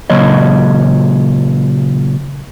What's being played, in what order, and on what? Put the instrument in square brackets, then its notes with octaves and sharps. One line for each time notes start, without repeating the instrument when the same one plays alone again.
[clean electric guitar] A#2 C#3 F#3 C#5 D#5